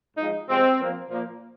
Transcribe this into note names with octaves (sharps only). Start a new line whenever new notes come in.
G#2 F3 G#3 D#4
C3 F3 G#3 C4
A#2 F3 A#3
A#2 F3 A#3